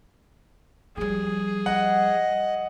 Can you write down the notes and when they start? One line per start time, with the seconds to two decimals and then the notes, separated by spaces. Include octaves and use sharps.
0.97 F3 G3 G#4
1.66 D#5 F#5